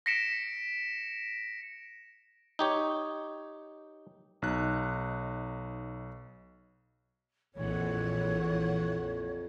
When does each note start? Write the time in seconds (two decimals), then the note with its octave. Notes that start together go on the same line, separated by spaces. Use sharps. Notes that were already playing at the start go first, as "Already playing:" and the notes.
0.06 A#6 B6 C#7 D7 E7
2.59 D#4 G4 C#5
4.42 B1 D#4 F#6
7.55 A#1 F2 E3 C#5 F#5